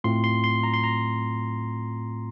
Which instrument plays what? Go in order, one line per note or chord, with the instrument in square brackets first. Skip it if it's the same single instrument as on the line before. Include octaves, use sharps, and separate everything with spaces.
[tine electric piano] A2 A3 C4 F4 C6
C6
C6
A#5
C6
A#5